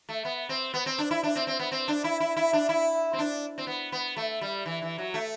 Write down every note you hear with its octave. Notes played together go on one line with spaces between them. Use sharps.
A3
B3
C4
B3
C4
D4
E4
D4
C4
C4
B3
C4
D4
E4
E4
E4
D4
E4
C4
D4
C4
B3
B3
A3
G3
E3
E3
F#3
A3